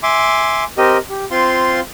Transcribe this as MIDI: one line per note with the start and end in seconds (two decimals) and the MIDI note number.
0.03 0.64 76
0.03 0.64 80
0.03 0.64 84
0.03 0.64 86
0.78 0.98 60
0.78 0.98 67
0.78 0.98 70
0.78 0.98 75
1.10 1.25 67
1.31 1.80 60
1.31 1.80 65
1.31 1.80 77
1.31 1.80 84